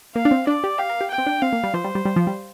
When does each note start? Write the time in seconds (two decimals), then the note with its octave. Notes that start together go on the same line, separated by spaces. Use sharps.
0.16 A#3 F5
0.25 D4
0.31 C4
0.47 D4 D5
0.64 G4
0.79 G4 F5
0.89 A#4
1.01 G4
1.11 G5
1.18 C4
1.26 D4
1.42 C4 F5
1.53 A#3
1.63 G3
1.74 F3 C5
1.84 G3
1.95 G3
2.05 G3
2.16 F3
2.27 G3